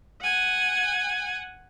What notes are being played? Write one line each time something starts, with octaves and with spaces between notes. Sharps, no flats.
F#5 G#5